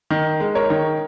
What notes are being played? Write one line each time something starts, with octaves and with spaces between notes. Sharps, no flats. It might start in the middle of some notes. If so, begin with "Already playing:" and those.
D#3
G#3
A#4 C#5
D#3